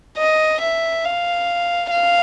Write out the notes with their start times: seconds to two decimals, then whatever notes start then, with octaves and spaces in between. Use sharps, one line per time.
0.17 D#5
0.61 E5
1.05 F5
1.91 F5